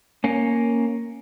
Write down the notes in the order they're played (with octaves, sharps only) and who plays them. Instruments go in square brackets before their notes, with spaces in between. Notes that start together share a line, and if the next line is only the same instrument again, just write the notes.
[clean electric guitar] A#3 C#4